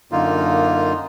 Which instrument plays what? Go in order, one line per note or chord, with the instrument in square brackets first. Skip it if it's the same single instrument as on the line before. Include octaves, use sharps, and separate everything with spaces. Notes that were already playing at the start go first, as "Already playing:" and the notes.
[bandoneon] F#2 D3 A#3 D#4 F4